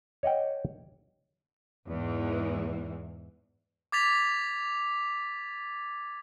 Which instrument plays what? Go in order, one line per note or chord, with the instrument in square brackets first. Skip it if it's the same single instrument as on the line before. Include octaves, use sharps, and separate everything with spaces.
[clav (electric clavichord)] C#5 D#5 F#5 G5
[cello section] E2 G#2 E3
[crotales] D6 G#6 A6 B6 F7